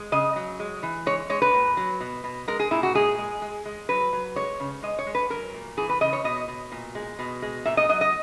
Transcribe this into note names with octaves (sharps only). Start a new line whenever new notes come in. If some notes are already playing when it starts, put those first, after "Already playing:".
Already playing: G#3
C#3 D#5
F#3
G#3
E3
G#3 C#5
G#3 C#5
B4
A#2
F#3
B2
B2
G#3 A#4
G#4
A#2 E4
F#4
G#3 G#4
G#3
G#3
G#3
F#3 B4
F#3
G#3 C#5
C#3
G#3 D#5
C#5
G#3
B4
F#3 A#4
A#2
E3 G#4
B4
C#3 D#5
C#5
B2 D#5
B2
A#2
G#3
B2
G#3
A#2 E5
D#5
F#3 D#5
D#5